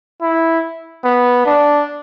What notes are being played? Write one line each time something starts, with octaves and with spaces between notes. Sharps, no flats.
E4
B3
D4